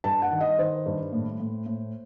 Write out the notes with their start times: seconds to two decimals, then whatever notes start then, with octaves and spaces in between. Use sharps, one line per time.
0.04 G2 A5
0.22 F#5
0.31 D#3
0.41 D#5
0.59 D#3 C5
0.86 G2
1.12 A2
1.40 A2
1.66 A2